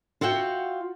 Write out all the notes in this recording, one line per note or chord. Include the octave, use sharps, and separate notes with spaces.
F4 F#4 E5 F#5 G5